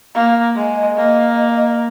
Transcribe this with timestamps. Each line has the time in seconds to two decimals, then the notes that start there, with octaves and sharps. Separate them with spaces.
0.15 A#3 F5
0.56 G#3
0.76 D#5
0.97 A#3 D#5